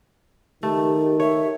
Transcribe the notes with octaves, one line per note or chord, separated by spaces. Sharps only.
D#3 A3 G4
C#5 E5